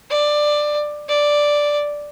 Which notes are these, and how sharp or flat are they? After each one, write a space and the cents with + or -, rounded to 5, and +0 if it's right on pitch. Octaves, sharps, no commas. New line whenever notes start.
D5 +15
D5 +0